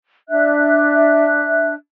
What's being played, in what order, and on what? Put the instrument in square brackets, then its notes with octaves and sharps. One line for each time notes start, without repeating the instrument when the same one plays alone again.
[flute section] D4 E5 F#6